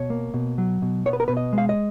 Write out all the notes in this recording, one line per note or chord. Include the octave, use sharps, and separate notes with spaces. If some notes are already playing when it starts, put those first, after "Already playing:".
Already playing: B2 C#5
A#3
B2
F#3
B2
B3 C#5
B4
A#4
B2 B4
D#5
G#3
F5
D#5